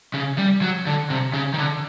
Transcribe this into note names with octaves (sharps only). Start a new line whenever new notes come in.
C#3
G3
F#3
D3
C3
C#3
D#3
D3